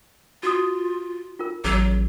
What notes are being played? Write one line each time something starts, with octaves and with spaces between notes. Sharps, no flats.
F4 F#4 D#6
F4 A#4
A1 F#3 G#4